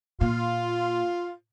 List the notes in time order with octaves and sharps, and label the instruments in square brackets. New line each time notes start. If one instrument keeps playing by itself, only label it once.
[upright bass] A#2 [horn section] F4